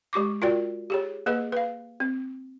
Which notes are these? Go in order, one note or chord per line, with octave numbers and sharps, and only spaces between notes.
G#3 G4 C#6 D6
F4 F#4 A#4 D5 G5
G4 G#4 C#5
A#3 G#4 B4 D#5
B4 F5
C4